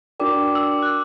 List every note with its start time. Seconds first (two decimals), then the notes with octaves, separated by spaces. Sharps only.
0.20 D4 F#4 A#4 D5 G5 D6
0.55 E6
0.82 F#6